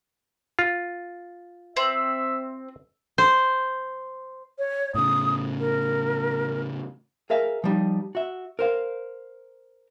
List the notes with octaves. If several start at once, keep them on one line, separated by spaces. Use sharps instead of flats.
F4
C4 E5
C5
C#5
A2 C#3 D#6
A#4
G#4 A#4 E5 F5
F3 G3 D#4
F#4 E5
A#4 C5 F5